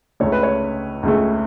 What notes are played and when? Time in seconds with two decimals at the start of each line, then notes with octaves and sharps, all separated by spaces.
0.20 C#2 C#3 A3 C#5
0.32 B4
0.43 C#5
1.03 C#2 C#3 A3